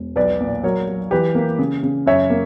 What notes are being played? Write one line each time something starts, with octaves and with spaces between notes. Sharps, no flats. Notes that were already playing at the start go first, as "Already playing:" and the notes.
Already playing: E1
B1 B4 D5
A#2
F#3 A#4 C#5
F#3
E3 G4 B4
A#3
C#3
C#3
F#2 C#5 E5
A#3